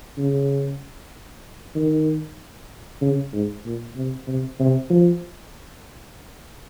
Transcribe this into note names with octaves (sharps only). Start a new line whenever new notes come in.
C#3
D#3
C#3
G#2
A#2
C3
C3
C3
F3